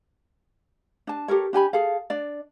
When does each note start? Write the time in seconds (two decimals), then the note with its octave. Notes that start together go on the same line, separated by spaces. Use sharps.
1.07 D4 A5
1.28 G4 A4 A#4 C#5
1.53 D4 G4 G#5 B5
1.73 G#4 A4 F5
2.10 D4 D5